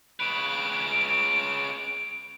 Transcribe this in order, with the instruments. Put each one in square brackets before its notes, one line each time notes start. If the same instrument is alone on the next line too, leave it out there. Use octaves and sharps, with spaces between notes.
[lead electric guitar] C#3 B4 [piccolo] D7